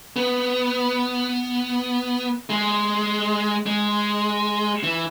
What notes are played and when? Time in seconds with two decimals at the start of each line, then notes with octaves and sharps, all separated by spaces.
0.16 B3
2.50 G#3
3.66 G#3
4.83 E3